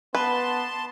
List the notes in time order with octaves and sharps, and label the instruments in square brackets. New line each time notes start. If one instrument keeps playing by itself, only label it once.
[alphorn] B3 [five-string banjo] B4 [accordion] A5 C6